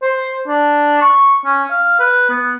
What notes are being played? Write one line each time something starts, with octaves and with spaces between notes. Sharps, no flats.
C5
D4
C#6
C#4
F5
B4
B3